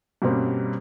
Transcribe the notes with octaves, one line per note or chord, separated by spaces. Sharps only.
G2 B2 G3 A#3 C4 C#4